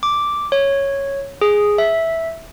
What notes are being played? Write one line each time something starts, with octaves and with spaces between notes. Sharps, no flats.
D6
C#5
G#4
E5